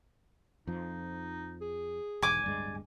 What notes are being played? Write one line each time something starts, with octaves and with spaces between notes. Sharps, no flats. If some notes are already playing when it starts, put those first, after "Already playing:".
F2 F3 D#4
G#4
E1 G#2 G#5 D6
D1 G2 G#3 D5